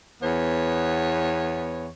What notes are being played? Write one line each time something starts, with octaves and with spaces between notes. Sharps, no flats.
E2 B3 C#5